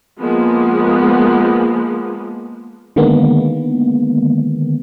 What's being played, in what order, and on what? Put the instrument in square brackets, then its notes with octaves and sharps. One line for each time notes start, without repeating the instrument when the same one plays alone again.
[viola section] F3 G#3 A#3 B3
[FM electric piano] D3 D#3 G#3 A#3 B3